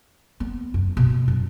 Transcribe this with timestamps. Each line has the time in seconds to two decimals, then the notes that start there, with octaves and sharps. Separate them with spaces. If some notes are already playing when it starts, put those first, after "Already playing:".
0.40 B3
0.74 F#2
0.97 B2
1.28 F#2